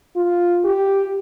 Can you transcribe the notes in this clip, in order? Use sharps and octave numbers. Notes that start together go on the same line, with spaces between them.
F4
G4